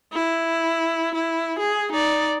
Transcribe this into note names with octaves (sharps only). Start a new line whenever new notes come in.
E4
E4
G#4
D#4 D5